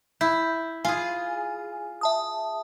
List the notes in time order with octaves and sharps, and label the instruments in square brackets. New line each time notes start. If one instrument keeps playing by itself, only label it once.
[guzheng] E4 [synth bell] G6
[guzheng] F4 G#4 [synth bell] G#5
[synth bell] E5 A5 D#6